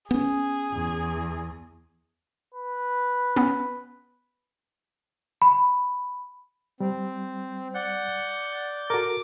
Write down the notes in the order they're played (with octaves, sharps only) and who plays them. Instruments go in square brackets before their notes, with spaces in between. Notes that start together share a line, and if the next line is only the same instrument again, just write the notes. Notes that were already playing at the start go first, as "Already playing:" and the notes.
[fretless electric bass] B3 C#4 [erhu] G#4
[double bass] E2
[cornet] B4
[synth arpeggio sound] B3 C#4
[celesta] B5
[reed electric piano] G3 [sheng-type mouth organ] C4
[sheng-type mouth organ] D5 G6 [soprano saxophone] F#5
[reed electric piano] F#4 A4 A#4 [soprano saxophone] D6